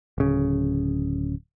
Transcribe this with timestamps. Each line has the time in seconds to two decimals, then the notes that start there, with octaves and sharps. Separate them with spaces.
0.18 D1 C#3